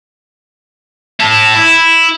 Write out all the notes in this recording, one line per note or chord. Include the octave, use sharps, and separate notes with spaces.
E4 A5
E4